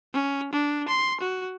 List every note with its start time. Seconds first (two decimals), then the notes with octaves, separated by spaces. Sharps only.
0.13 C#4
0.52 D4
0.88 C6
1.20 F#4